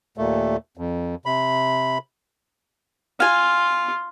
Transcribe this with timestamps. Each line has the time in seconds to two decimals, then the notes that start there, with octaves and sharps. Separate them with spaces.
0.18 D#2 A#2 A3
0.77 F2
1.26 C3 B5
3.20 F4 F5 G#5